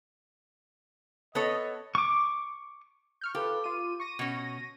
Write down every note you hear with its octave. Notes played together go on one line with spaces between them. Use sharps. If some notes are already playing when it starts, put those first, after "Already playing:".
B3 A4 C#5 D#5
C#6 D6
C#6 F6 G6
F4 G4 A4 B4
F4 D#7
C#6 A#6 D#7
B2 C#4